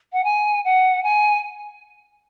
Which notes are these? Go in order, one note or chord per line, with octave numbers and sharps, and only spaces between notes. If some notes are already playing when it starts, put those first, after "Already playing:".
F#5
G#5
F#5
G#5